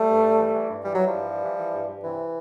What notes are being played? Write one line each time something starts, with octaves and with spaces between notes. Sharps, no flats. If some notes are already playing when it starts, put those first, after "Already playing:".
Already playing: G3 A3
G2
G2
E3
E3
G2
E3 G3
E3 F#3
F3 G3
G2
E3
E3
E3
G2
G2
C3 E3